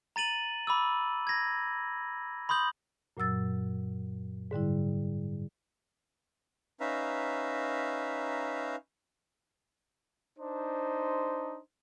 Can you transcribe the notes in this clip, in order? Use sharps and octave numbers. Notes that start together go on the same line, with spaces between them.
A#5 A6 D#7 F#7
B5 D6 E6
G#6 A#6
B5 C6 D#6 G6 F#7
F#2 A#2 F#3 E6 A6
G#2 D3 G3 E4
C#4 D#4 B4 E5 F5 A#5
D4 D#4 C5